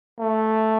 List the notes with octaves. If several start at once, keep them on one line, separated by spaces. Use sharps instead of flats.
A3